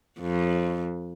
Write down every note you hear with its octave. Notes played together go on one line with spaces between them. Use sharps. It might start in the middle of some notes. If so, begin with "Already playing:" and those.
F2